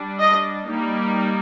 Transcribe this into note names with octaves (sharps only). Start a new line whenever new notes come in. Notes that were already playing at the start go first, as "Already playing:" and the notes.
Already playing: G3 D4
D#5
G3 A#3 D#4